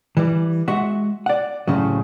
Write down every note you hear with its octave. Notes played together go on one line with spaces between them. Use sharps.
E3 G3
G#3 F#4 E5 F#5
D5 F#5
C2 A2 C#3 F#3